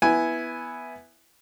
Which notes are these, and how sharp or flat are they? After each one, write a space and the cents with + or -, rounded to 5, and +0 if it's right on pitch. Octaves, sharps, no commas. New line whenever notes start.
B3 +0 E4 +0 G#5 +0